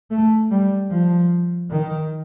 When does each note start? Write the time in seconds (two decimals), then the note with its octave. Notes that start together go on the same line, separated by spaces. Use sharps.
0.11 A3
0.51 G3
0.91 F3
1.71 D#3